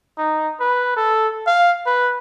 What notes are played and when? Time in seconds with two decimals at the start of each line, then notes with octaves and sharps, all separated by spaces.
0.18 D#4
0.60 B4
0.97 A4
1.47 F5
1.86 B4